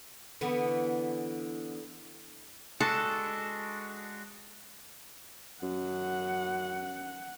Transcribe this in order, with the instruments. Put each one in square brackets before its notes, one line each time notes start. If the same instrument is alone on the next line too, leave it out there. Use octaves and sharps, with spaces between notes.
[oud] D3 E3 B3
[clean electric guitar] G#3 D4 F#4 [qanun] A4
[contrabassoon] F#2 [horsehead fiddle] F#5